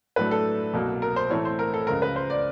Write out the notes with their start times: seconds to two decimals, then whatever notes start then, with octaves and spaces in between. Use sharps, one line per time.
0.16 A2 F#3 A3 D4 B4
0.31 A4
0.73 C2 B2 F#3 A#3
1.02 A#4
1.16 C5
1.30 A2 E3 A3 C4 C#5
1.45 C5
1.59 A#4
1.74 A4
1.87 C#2 C#3 F3 G#3 A#4
2.02 B4
2.16 C5
2.30 D5